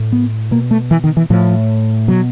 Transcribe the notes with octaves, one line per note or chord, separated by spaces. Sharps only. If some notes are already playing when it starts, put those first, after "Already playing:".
Already playing: A2
B3
B2 A#3
A3
E3
D#3
E3
A2 F3
B2 F#3